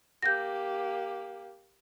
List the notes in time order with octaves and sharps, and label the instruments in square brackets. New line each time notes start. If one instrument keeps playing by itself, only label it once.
[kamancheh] A#3 G4 [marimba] G6 A#6